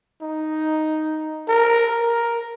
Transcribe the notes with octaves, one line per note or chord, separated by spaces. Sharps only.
D#4
A#4
A#4